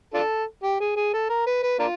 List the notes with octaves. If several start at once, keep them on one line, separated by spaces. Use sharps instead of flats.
D4 F4 A4
G4
G#4
G#4
A4
A#4
B4
B4
A#3 D4 F4